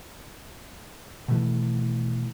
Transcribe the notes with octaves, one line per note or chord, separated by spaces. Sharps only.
B2 D#3 E3 A3